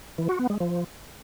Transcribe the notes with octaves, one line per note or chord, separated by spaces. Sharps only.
E3
F#4
B3
G#3
F3